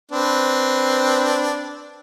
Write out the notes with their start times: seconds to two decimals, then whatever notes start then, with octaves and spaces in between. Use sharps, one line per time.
0.12 C4 D4 B4